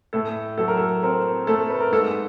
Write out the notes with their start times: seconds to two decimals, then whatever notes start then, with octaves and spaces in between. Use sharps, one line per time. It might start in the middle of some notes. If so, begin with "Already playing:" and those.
0.13 A2 A4
0.58 F#3 A4
0.68 A#4
0.77 A4
1.03 C4 A#4
1.47 A3 A4
1.70 B4
1.80 A#4
1.92 G#2 A4